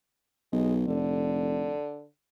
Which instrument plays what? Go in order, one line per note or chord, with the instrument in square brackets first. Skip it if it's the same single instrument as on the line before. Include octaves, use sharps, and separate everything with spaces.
[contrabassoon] B1 [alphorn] G#3
[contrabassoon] F1 [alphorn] D3